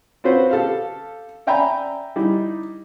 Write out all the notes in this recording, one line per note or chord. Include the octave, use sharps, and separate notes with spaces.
C4 F4 F#4 B4 C5
G4 A4 F5
D5 E5 G5 G#5 A#5 B5
G3 D#4 E4